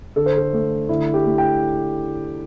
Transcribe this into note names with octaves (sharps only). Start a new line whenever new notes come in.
D3 A4
C5
A4
A3
D3 E4
G4
A3
G5